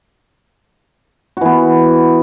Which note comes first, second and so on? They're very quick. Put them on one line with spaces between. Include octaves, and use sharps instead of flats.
F#4 E3 B3